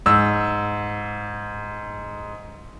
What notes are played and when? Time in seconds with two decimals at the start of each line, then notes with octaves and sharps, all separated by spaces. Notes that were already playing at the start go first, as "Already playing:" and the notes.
0.06 G#2 E6